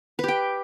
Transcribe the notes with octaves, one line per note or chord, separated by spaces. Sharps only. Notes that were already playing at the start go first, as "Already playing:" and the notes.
G4 B4 G5